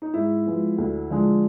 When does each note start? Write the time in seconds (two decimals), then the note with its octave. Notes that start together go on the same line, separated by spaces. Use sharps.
0.02 D#4
0.14 G#2 E4
0.46 F3 G#3 B3
0.78 D2
1.10 D3 F3 G#3